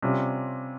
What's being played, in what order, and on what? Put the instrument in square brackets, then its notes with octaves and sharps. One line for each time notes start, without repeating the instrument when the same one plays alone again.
[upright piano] C3 G3 C#4 F4